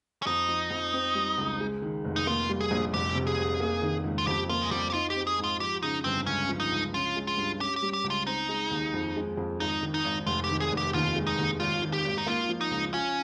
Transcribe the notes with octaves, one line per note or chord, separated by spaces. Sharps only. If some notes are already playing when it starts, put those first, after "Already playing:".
C#4
F2 D#4
F3
F2
C4
G3
C#2
G#3
D#3
F1
D#4
A#3 F4
G3
G#4
A#1
F1 G4
C3
G#4
F1
A#3
D#3
C#2
F4
F2 G4
A#3 F4
G#3
F2 G3
G4
D#4 F4
G4
C4
G#4
G#2
F4
F3 G4
C#3 D#4
G1 C4
C#2 C#4
F3
D#4
C#2
C#4 F4
G#3
F4
G2
C#4 G4
G4
G3
G4
C#2
F4
C4 D#4
G#3
D#2
F2
G#3
F2
G#1 D#4
D#3
D#4
G#1
F1 F4
G4
D#3
G#4
F1
G4
D#2 F4
G#3
D#4
D#2
G#1 F4
D#3
G4
G#1
D#4
A#3 F4
F3
D#4
C#2
C#4 F4